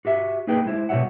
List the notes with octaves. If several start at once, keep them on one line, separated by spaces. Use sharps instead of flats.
F#4 G4 E5
A#3 D#4 G#4 B4 G5
G#3 E4 C5
B2 G3 F#4 C#5 E5 F#5